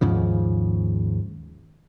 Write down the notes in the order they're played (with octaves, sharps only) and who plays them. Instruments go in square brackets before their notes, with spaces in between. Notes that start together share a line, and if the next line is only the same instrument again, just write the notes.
[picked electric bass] D#2 G#2 C#3 F3